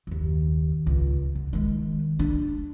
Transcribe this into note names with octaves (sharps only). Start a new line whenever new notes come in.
F#1 D#2
C#2
D3
D#3 G#3
D4